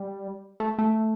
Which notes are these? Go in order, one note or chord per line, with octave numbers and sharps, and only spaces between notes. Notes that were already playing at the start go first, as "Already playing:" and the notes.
Already playing: G3
A3
A3